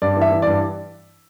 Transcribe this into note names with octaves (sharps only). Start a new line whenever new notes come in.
G2 D5
E3
E5
E3
G2 D5